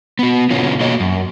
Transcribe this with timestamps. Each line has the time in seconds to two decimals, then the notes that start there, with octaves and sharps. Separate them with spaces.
0.19 B3 F#4
0.50 B2 D3 C#4 F4
0.81 A#3 F#4 C#5 D#5
1.00 F#2